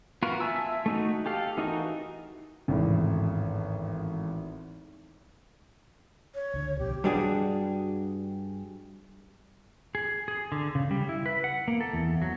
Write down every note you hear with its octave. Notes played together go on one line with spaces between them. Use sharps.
B3 F4 F#4 A#4
E5 G#5 A5 E6
A3 D#4 F#4
G4 A4 F5
E3 D#4 F#4 A#4
G#1 E2 A2 C#3
C#5
C#2 D3
B1 B2 F3 G4
G2 G3 D4 F#4 G#4
G#4
G#4
D3
C#3
G3
E4
B4
F#5
A#3
A4
E2
F#3